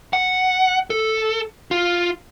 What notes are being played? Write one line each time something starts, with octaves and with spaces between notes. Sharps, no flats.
F#5
A4
F4